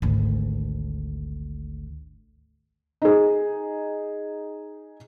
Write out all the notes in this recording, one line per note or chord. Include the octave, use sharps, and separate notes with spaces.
G#1 D2
D#4 G#4